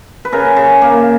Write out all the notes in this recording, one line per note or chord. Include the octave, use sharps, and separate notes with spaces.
B4
C#3 A#4
C#3
A#3